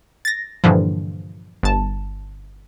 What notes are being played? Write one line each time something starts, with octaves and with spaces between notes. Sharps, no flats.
A6 A#6
G2 A#2 D3 E3 F3
G1 A5